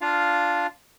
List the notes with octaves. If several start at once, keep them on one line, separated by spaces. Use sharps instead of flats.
D4 F4 F5